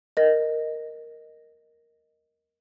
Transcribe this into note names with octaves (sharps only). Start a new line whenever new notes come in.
A#4 D#5